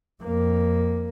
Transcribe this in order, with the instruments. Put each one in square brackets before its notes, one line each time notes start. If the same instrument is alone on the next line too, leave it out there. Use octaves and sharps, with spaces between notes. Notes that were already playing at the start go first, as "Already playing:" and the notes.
[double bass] F2 A#3